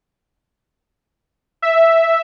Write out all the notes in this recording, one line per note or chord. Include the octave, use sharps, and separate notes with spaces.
E5